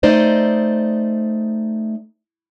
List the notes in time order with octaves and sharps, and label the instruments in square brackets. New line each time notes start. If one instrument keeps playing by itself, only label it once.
[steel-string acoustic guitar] A3 D#4 C5 D5 D#5